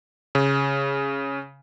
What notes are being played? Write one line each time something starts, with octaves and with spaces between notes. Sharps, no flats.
C#3